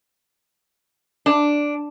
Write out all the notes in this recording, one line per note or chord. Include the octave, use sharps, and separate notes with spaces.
D4